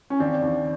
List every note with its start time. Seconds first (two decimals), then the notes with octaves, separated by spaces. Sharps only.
0.10 C#4
0.20 D#2 C4 D4
0.42 D#2